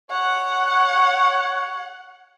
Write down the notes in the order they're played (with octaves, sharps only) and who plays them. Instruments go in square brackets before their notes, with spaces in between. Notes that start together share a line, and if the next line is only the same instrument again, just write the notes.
[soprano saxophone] C#5 [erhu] F#5